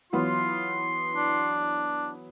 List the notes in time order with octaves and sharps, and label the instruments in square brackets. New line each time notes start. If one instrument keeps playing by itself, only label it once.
[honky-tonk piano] E3 F#3 B3 [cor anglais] F4 [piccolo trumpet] C6
[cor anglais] D4